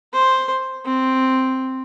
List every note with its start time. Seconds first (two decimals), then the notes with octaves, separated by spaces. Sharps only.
0.13 C5
0.85 C4